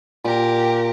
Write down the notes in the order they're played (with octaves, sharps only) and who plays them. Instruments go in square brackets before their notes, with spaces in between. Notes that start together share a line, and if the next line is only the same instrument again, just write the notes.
[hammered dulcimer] A#2 [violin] G4 A#4